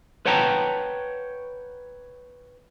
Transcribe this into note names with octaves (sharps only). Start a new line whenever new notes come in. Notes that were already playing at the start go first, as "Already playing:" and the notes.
B4 C#5 F#5 G5 A5 A#5